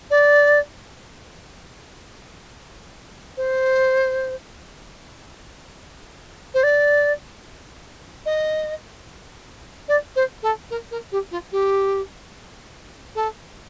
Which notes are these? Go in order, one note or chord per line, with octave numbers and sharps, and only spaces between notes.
D5
C5
C5
D5
D#5
D5
C5
A4
A#4
A#4
G4
F4
G4
A4